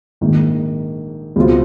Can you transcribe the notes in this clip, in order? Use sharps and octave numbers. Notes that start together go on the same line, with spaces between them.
A#1 G#2 D#3
C#2 B2 G#3 C4 F4